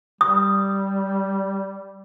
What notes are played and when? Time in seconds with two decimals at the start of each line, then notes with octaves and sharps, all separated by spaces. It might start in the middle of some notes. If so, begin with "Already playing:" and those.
0.21 G3 D#6